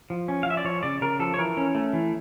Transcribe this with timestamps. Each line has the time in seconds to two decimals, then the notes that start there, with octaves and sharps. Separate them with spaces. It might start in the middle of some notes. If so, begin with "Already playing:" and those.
0.10 F3
0.28 C#4
0.43 F5
0.46 F3 E5
0.57 D5
0.65 F3 C#5
0.83 C#3 D5
1.01 C#3 A#4
1.20 F3 A4
1.34 C#5
1.38 E3 A#4
1.57 C#4
1.75 A3
1.93 E3